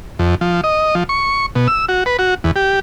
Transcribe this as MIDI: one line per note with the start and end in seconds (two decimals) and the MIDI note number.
0.19 0.35 41
0.41 0.61 53
0.64 0.95 75
0.95 1.04 53
1.09 1.46 85
1.55 1.68 47
1.68 1.86 88
1.89 2.04 66
2.06 2.17 71
2.19 2.34 66
2.44 2.51 40
2.56 2.80 67